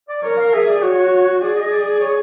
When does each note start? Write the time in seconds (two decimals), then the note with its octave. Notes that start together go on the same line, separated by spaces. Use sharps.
0.09 D5
0.23 A#4 C#5
0.38 F5
0.53 G#4 E5
0.67 D5
0.83 F#4 C#5
1.41 G#4 D5
1.56 D#5
1.72 D5
2.01 C#5